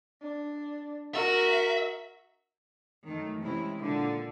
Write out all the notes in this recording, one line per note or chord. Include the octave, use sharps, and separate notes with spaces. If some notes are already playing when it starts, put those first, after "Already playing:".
D4
F#4 A#4 E5
F#2 D#3 A3
C3 E3 G#3 C#4 E4
A#2 D3